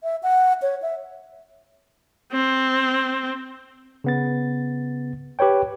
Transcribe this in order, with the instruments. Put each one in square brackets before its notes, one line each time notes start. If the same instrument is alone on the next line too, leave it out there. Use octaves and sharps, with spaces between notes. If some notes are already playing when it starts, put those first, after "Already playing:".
[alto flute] E5
F#5
C#5
E5
[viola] C4
[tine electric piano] C#3 B3 A6
G4 B4 C#5 G5